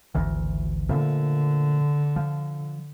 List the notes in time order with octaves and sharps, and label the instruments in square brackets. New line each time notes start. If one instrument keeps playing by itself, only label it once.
[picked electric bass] G#1 D2 E3
[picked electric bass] A#2 F3 A3 [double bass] D3
[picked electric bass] F3